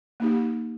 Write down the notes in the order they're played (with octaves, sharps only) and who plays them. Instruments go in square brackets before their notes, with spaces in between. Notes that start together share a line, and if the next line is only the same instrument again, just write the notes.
[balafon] A#3 D#4 G4